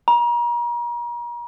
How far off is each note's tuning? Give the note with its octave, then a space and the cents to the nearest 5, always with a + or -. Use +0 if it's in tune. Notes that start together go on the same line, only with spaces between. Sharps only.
A#5 +40